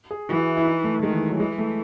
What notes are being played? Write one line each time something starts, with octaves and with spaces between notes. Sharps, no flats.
G#4
E3 F#4
E4
E4
D#4
A3
D#3 G#3
E3
F#3
E3 G#3
A3